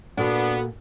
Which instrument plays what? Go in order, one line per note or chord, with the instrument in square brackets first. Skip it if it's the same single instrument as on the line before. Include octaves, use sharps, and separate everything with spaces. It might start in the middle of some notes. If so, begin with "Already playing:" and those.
[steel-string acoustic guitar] A#2 [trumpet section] B3 [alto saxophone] D4 [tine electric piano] F#4 A4 F#5